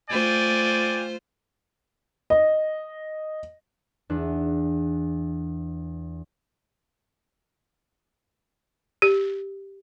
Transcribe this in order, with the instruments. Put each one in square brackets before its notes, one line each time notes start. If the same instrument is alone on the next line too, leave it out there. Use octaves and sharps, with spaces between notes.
[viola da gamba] A3 F4 C5 [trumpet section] D5 G5 G#5
[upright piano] D#5
[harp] E2 D4
[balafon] G4